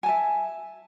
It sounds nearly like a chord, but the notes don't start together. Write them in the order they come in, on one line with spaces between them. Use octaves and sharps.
G#5 A5 E5